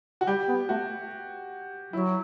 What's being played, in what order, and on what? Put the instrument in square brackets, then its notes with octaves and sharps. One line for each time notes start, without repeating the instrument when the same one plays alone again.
[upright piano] F#4
[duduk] G3 [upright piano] G4
[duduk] B3
[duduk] A3 [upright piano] F#4
[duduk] F#3 [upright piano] E4